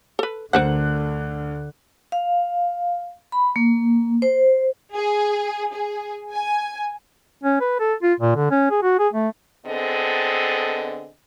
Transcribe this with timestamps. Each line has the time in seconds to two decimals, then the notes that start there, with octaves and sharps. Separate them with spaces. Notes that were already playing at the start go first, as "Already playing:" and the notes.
0.19 A4 B4
0.53 D2 D3 A#4 C5 F#5 F#6
2.12 F5
3.32 B5
3.56 A#3
4.22 C5
4.94 G#4
5.71 G#4
6.33 G#5
7.43 C#4
7.61 B4
7.80 A4
8.03 F4
8.20 A#2
8.36 D3
8.51 C#4
8.70 G#4
8.83 F#4
8.99 G#4
9.13 A3
9.66 D3 B3 C4 G#4 A4 D#5